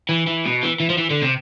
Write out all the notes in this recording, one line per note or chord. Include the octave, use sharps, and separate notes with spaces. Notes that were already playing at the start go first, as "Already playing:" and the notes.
E3
E3
B2
E3
E3
F3
E3
D3
C3